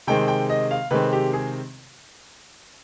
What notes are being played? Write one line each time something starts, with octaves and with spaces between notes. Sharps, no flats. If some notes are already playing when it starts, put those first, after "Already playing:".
C3 D#3 G#3 C4 G5
G5
D#5
F5
C3 D#3 G#3 C4 B4
G4
G#4